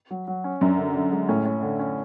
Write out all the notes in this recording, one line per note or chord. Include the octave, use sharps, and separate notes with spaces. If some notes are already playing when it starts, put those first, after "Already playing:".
F#3
F#3
C#4
F#2 D4
D3
D3
G#3
A2 C#4
C#4
D3
C#4